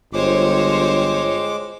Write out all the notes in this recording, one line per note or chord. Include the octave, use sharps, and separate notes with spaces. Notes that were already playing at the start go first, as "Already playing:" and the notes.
G1 G#3 F4 C5 C#5 G5 D6